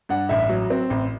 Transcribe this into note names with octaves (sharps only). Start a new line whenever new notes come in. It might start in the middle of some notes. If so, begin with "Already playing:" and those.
G2 F#5
A1 E5
F#3
C4
A1